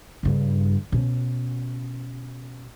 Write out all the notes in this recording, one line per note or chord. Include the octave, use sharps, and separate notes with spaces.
G2 C#3
B2 C#4